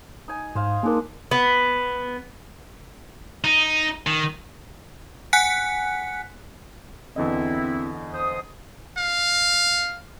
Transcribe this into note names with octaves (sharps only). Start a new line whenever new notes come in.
D#4 G#5
G#2 C5 D#5 F5
G#3 A#3 D4 D#4 A#4
B3
D#4
D#3
F#5 G#5 F#6 B6 C#7
E2 D3 C4 E4 D#5
C5 D#6
F5